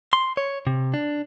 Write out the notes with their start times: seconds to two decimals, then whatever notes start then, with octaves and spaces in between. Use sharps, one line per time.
0.13 C6
0.37 C#5
0.67 C3
0.94 D4